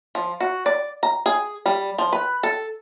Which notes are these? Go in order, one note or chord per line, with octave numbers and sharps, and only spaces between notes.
F3
F#4
D5
A#5
G#4
G3
F3
B4
A4